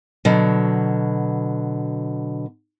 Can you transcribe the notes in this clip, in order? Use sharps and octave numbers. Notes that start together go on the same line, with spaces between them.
B2 D3 F#3